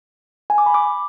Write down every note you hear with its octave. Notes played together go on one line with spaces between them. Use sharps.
G#5
D6
B5
D6